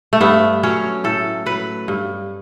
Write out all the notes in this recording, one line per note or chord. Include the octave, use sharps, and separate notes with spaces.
A3
G2 B3
F#3 C#4
A2 A4
F#3 B4
G2